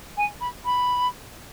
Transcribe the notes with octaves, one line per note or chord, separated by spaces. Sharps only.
G#5
B5
B5